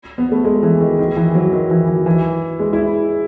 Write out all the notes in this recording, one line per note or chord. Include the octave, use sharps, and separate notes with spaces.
B3
A3
G#3
E3
D#3
D#3
E3
F#3
D#3
E3
E3
E3
G#3
E4